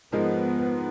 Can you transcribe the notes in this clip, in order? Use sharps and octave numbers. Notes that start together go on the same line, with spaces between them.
G#2 F3 G#3 B3 D#4 A#4